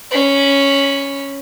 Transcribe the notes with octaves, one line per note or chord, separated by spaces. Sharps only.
C#4 B5